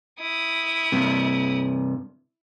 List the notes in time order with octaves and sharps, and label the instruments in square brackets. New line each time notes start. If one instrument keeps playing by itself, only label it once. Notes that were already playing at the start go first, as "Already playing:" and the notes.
[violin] E4 D#6
[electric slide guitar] G2 C3